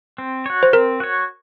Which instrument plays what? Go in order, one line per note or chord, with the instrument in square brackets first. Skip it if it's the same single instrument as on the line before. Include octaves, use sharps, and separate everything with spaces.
[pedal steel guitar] C4
F#4 C#5
[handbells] C5
[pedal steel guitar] C4 [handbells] A#4
[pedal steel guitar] F#4 C#5